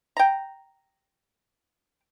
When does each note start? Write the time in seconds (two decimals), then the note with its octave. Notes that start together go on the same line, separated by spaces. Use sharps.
0.17 G5 A#5